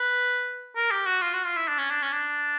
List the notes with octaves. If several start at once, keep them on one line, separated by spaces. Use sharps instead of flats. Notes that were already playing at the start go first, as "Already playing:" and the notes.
Already playing: B4
A#4
G4
F#4
F4
F#4
F4
E4
D4
C#4
D4
C#4
D4